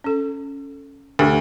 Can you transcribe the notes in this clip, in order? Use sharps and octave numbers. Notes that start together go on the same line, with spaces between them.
C#4 A4
D2 G4 A4 G5